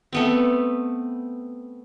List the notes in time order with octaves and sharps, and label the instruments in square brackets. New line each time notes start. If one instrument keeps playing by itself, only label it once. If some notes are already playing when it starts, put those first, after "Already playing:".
[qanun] A3 B3 C4